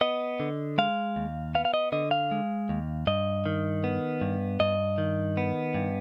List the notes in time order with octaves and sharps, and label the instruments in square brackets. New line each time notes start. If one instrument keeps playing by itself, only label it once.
[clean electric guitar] B3 D#5
D3
G#3 F5
D#2
B3 F5
F5
D#5
D3 D#5
F5
G#3
D#2
G2 D#5
D#3
B3
G2
G2 D#5
D#3
B3
G2